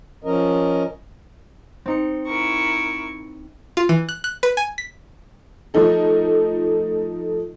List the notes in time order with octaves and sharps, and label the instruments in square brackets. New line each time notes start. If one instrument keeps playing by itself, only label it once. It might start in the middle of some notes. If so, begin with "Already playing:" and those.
[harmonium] F3 C#4 A#4 D#5
[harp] C4 D#4 C#7
[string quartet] E4 A#4 C#6
[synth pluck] F4
E3
F#6
F#6
B4
G#5
B6
[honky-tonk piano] F3 A3 D#4 A4